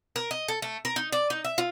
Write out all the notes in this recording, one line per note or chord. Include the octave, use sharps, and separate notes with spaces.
A#4
D#5
A4
A3
A#4
D#4
D5
D#4
E5
F4